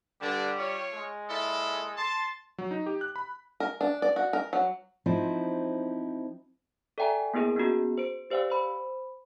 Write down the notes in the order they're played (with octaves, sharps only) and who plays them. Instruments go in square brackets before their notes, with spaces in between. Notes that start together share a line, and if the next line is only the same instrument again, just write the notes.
[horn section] G2 D3 D4 [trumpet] G3
[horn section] F4 C#5
[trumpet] G#3
[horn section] A#2 E4 A4
[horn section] A5 [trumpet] C6
[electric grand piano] F#3
D#4
G4
F#6
B5
[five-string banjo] A#4
D4
D5
F#4
A#4
F#3
[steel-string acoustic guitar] F3 C4 D#4 E4
[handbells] A4 D5 E5 G5 G#5 A#5
A#3 B3 E4 G#4 A#4
B3 C#4 F4 F#4 G#4
C5 D7
G4 C5 D5 F5 G5 E6
C5 B5